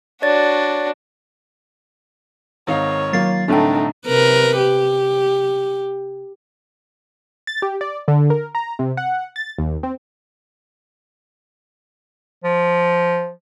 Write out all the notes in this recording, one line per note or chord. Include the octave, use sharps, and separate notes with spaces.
D4 F#4 C#5 D5 A6
G#1 D#4 C#5 F5
D#3 F#3 A#3 F4 A6 C7
C2 A2 D3 A3 D4 D#4 G5
C3 A#4 B4
G4
A6
G4
D5
D3
A#4
A#5
C3
F#5
A6
D#2
C4
F3